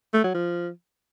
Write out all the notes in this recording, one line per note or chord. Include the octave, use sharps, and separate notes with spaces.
A3
F#3
F3